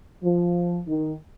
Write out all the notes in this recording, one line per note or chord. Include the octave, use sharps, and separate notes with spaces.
F3
D#3